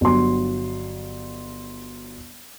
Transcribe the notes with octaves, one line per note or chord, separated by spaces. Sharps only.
G1 F#3 C6